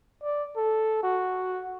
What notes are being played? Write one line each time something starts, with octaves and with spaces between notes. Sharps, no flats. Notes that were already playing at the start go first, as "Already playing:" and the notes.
D5
A4
F#4